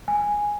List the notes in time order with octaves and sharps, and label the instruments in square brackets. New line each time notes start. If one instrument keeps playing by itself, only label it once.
[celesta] G#5